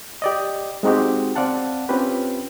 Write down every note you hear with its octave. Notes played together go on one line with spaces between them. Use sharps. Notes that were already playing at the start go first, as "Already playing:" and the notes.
G4 D5 D#5
G#3 C4 D#4 F#4 G4
C4 D5 F5 F#5 A5
C4 C#4 F4 G4 B4